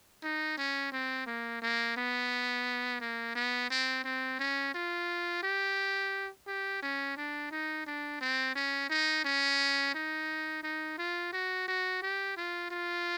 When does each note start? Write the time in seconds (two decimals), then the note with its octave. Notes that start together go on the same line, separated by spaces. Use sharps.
0.23 D#4
0.57 C#4
0.92 C4
1.27 A#3
1.62 A#3
1.97 B3
3.01 A#3
3.35 B3
3.71 C4
4.05 C4
4.39 C#4
4.74 F4
5.43 G4
6.47 G4
6.83 C#4
7.17 D4
7.51 D#4
7.87 D4
8.21 C4
8.55 C#4
8.90 D#4
9.25 C#4
9.95 D#4
10.63 D#4
10.98 F4
11.33 F#4
11.68 F#4
12.02 G4
12.37 F4
12.71 F4